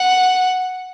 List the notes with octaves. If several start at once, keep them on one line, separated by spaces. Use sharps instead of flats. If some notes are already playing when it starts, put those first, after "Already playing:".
Already playing: F#5